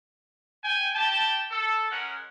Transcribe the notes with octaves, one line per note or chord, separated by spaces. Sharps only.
G5 G#5
G4 G5 A5
A4
G#3 C#4 A#4 F#5